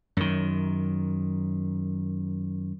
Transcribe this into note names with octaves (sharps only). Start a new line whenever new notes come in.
F#2 D#3